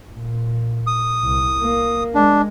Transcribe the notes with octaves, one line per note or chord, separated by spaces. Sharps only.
A#2
D#6
C2
A#3
G#3 D4